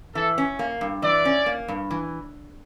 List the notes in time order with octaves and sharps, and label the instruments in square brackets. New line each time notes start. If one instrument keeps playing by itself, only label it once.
[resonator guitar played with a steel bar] E3 [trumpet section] A4
[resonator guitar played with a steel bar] C#4
A#3
G2
[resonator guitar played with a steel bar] E3 [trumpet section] D5
[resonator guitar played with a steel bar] C#4
A#3
G2
E3